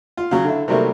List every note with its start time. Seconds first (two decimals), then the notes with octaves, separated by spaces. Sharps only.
0.17 F4
0.31 C#3 F#3
0.45 D3 E4
0.68 C3 D#3 F#3 G3 A3 A#3